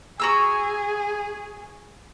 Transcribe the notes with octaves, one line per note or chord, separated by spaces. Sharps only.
F#4 G#4 A#5 E6